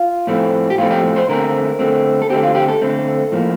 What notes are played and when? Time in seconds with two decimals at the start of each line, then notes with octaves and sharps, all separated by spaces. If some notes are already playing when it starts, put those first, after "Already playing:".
Already playing: F4
0.27 A2 F3 A3 C4
0.70 G4
0.78 A2 F3 A3 C4 F4
0.91 G4
1.16 C5
1.29 D3 A3 C4 A#4
1.79 D3 A3 C4
2.22 A4
2.29 D3 A3 C4 G4
2.43 F4
2.55 G4
2.68 A4
2.81 D3 A3 C4
3.32 A2 F3 A#3